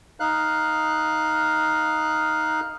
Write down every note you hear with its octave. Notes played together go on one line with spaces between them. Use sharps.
D#4 F5 F#6